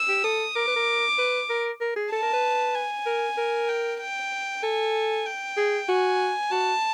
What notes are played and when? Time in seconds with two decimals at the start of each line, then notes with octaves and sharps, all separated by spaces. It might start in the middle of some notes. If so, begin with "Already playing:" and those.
Already playing: E6
0.08 G4
0.24 A4 D#6
0.55 A#4 D6
0.67 B4
0.76 A#4
1.18 B4
1.49 A#4
1.81 A#4
1.96 G#4
2.11 A4 A5
2.22 A#4
2.33 B4
2.75 G#5
3.06 A#4
3.37 A#4
3.69 G5
4.01 G5
4.63 A4 G#5
5.26 G5
5.57 G#4
5.88 F#4 G#5
6.51 F#4 A5